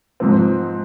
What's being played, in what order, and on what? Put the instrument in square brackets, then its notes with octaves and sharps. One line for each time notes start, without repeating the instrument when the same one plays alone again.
[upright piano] G#2 F3 C4